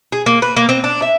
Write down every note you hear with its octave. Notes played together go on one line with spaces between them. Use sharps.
G#4
A#3
B4
A#3
C4
D4
E5